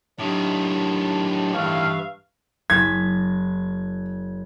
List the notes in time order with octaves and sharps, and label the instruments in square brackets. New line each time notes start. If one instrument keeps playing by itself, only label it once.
[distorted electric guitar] A2 D#3 [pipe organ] F#3 D4 G4
[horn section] G2 E5 F5 [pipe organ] E3 C#6
[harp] F#1 B6 [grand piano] G#6